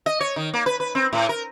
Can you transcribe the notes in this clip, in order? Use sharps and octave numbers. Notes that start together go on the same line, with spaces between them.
D#5
C#5
D#3
A#3
B4
B4
C4
A2
A#4